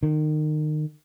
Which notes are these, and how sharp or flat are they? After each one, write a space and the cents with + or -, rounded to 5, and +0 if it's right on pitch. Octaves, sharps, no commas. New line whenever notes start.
D#3 -30